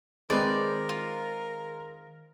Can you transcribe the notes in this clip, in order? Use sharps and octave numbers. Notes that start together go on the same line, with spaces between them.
D#3 G#3 C4 A#4 B4 D5
F4